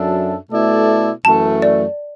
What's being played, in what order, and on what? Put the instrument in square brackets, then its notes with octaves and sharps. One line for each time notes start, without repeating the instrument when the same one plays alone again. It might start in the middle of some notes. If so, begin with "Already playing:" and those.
Already playing: [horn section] F#2 F#3 D4 A4 E5
B2 A3 E4 A4 D5
[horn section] F#2 E3 A3 [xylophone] A5
[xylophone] D5